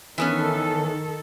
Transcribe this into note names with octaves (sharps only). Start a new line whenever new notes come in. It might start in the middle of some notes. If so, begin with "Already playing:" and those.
D#3 E3 B3 C#4 A4